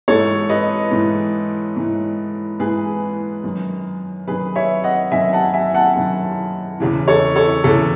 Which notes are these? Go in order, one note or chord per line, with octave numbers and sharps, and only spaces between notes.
G#2 E3 A4 C#5
B4 D#5
G#2 E3
G#2 E3
G#2 E3 G#4 B4
F#2 D#3
F#2 D#3 G#4 B4
C#5 E5
D#5 F#5
F#2 D#3 E5 G#5
F#5 A5
E5 G#5
F#5 A5
F#2 D#3
E2 C#3 E3
A4 C#5
A4 C#5
E2 C#3 E3 A4